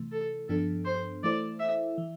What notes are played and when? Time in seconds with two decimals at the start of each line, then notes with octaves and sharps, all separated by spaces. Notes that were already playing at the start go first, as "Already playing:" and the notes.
Already playing: C3 E3 A3
0.12 A4
0.49 G2 F3 B3 D4 A4
0.85 C5
1.23 E3 A3 E4 A4 C5 D5
1.60 E5
1.98 E3